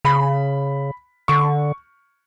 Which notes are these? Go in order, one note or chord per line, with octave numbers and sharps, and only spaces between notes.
C#3 B5
D3 C#6